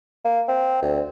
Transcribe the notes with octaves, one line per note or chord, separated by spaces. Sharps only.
A#3
C4
D2